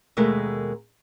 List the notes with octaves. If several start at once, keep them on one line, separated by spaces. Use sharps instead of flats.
D#2 B2 G#3 A3 A#4